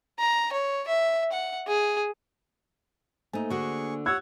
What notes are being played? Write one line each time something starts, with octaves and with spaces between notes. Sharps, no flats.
A#5
C#5
E5
F#5
G#4
A3 A#3 D#4 C5 G#5
D3 F#4 G#4 C#6
C#5 F#5 E6 F#6 G#6